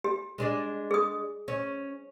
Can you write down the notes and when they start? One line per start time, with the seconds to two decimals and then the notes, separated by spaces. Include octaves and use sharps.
0.04 G4
0.38 G#3 D4 D5
0.91 G#4 D#6
1.48 C#4